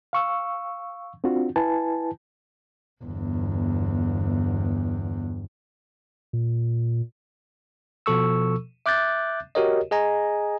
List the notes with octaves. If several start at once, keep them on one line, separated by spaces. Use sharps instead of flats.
F5 C#6 E6
C4 D4 F4 F#4
E4 B4 G#5 A5
G1 E2
A#2
B2 F3 A4 C#6 E6
E5 D6 F#6 G6 A6
F#4 G4 A#4 C#5 D#5
G#4 D#5 G#5 A#5